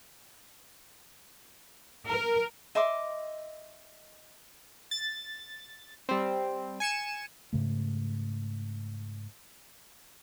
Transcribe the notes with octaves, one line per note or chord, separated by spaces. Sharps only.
A#4
D#5 E5 C6 D6
A6
G3 C4
G#5 C#7 E7
G#2 C#3 A3